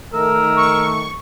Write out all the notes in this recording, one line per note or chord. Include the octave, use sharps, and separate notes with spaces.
D#3 A3 A#4 E6
C#6